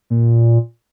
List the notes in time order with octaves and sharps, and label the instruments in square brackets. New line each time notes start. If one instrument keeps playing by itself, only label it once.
[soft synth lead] A#2